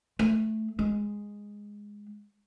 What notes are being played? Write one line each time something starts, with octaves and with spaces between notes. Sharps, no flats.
A3
G#3